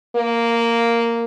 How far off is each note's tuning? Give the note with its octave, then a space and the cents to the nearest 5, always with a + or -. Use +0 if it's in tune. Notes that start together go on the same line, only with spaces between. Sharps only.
A#3 -5